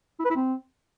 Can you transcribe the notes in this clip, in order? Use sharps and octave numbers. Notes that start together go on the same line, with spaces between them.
E4
B4
E4
C4